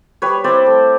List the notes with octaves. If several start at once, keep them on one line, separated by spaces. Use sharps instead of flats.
G3 B4 C#5
C4 E4 C5 D5
A3